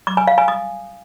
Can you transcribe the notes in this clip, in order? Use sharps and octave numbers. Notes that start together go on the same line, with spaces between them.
D6
G#5
F5
G#5
D#6